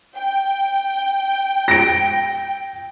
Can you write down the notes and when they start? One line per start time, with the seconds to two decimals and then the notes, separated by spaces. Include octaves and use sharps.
0.15 G5
1.68 A#6 D7